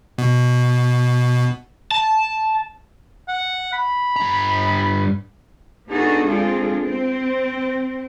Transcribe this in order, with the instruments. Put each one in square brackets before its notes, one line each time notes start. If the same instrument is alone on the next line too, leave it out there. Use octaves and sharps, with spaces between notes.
[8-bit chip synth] B2
[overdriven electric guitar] A5
[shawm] F#5
B5
[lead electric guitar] G2 A#5
[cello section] B3 D4 D#4 F#4 G#4 A4
G#3 C4 D4 F4 G#4 A4
C4